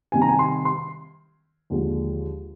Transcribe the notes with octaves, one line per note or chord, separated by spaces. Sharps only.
C3 D#3 G3 G#5
A#5
G#5
C6
C6
D#2 D3 F3 G#3